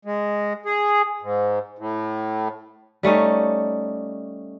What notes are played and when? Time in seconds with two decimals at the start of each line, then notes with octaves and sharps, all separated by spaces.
0.05 G#3
0.66 G#4
1.22 G#2
1.78 A2
3.03 G3 A3 C#4 D#4